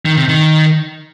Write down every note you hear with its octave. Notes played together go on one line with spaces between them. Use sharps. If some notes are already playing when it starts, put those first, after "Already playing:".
D#3
C3
D#3